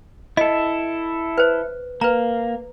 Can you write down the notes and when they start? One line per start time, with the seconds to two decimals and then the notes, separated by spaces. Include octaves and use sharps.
0.37 E4 A4 D#5
1.38 B4 C5
2.01 A#3 B4 A#5